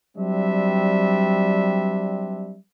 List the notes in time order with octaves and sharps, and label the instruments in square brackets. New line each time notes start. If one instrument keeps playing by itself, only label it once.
[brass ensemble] F#3 G3 C4 D4 E5